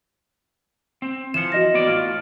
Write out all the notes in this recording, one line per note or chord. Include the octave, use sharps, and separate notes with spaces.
C4
E3 F3 C#7 E7
F#4 D#5 A#6
B3 D5
A2 F4